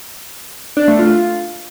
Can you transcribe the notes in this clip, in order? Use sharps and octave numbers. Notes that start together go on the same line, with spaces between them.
D4
A3
F4